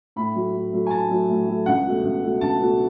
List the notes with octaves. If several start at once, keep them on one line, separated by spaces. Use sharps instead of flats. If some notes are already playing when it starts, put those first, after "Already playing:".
A2 B5
F#3 A3
A2
F#3 A3
G#5
A2 A5
F#3 A3
A2
F#3 A3
C#2 F#5
B2 A3
C#2
B2 A3
C#2 A5
B2 A3